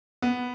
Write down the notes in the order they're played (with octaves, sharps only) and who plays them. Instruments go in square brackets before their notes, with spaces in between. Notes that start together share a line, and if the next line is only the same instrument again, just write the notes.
[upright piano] B3